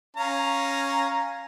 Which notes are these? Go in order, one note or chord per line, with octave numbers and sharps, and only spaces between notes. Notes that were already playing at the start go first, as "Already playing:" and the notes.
C#4 F5 A#5